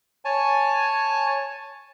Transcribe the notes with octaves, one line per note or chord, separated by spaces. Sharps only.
C#5 G#5 A5